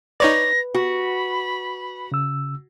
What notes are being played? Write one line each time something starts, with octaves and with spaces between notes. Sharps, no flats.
D#4 B4 C#5 D5 A#6
F#4 B5
C#3 E6